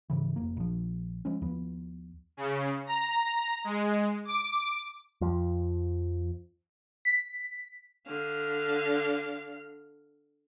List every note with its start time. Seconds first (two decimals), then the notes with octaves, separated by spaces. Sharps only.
0.10 G#2 C#3 E3
0.36 F1 A#3
0.57 A#1 F3
1.25 F3 G#3 C#4
1.42 D#2 F3 B3
2.37 C#3
2.86 A#5
3.64 G#3
4.25 D6
5.21 F2 F3
7.05 B6
8.07 D3 F5